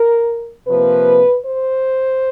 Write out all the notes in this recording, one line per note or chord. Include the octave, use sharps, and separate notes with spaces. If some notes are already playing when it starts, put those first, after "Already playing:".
Already playing: A#4
C3 F3 A#3 B4
C5